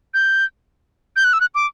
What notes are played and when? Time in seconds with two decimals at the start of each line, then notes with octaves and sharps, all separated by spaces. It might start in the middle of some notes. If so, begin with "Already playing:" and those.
0.14 G6
1.16 G6
1.24 F#6
1.33 E6
1.41 F#6
1.55 D6